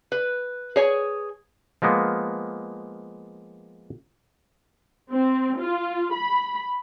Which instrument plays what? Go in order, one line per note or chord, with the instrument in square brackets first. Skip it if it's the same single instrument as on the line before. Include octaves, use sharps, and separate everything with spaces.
[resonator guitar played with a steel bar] B4
G#4 C#5 G#5
[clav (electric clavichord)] F3 G#3 A#3 B3
[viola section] C4
F4
B5